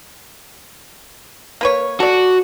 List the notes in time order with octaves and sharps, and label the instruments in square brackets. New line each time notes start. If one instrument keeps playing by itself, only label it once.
[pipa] A#3 B4 C#5
[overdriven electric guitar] F#4 [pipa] A4 D5